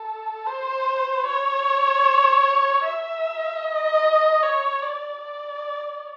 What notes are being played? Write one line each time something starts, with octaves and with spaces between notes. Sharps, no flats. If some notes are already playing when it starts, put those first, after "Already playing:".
Already playing: A4
C5
C#5
E5
D#5
C#5
D5
D5